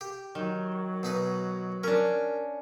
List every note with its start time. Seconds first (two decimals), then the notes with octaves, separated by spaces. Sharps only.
0.01 G4
0.35 D#3 F#3
1.03 B2 D#4 B4
1.83 C#4 D4 A#4